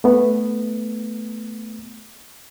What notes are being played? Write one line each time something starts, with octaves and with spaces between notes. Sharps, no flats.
A3 B3